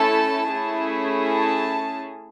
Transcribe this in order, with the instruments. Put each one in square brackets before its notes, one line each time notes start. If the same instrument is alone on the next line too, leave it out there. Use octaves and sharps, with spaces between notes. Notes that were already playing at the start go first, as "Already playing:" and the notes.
Already playing: [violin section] A3 C#4 E4 A4 A5
A3 C#4 E4 G#4
A5